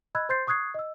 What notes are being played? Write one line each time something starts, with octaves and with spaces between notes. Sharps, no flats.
D#5 B5 E6 F#6 G#6
C5 C6 G6 A6 C7
C#6 D#6 F#6 G#6 C7
D#5 E6